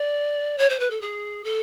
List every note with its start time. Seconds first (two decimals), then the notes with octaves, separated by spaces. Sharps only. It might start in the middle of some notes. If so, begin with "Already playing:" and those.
Already playing: D5
0.58 C#5
0.69 C5
0.79 B4
0.90 A4
1.01 G#4
1.44 A4